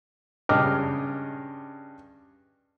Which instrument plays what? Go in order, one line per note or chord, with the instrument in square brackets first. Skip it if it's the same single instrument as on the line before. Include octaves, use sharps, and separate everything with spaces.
[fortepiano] G2 C#3 D#5 G5 D6 F6